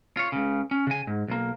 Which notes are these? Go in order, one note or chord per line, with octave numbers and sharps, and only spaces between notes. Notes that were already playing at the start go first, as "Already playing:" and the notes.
F4 C#5
C#2 C#3
C#4
C#3 G#5
G#2
B1 A#3